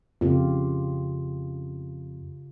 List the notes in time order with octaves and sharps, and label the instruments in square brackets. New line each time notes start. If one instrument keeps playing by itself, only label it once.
[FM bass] F2 [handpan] C#3 F4 G4